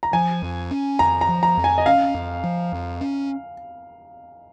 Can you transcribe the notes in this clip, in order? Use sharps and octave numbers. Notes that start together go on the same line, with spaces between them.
A#5
F3 G#5
F2
C#4
F2 A#5
A#5
F3
A#5
F2
G#5
D#5
C#4 F5
F2
F3
F2
C#4